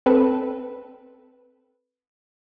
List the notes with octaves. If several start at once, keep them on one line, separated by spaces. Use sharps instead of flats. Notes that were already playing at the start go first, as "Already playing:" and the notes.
C4 A4 B4